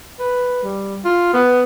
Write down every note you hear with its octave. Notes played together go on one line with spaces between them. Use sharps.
B4
G3
F4
B3